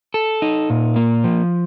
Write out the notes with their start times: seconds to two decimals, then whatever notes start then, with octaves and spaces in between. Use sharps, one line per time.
0.14 A4
0.42 D#4
0.70 A#2
0.96 A#3
1.24 F3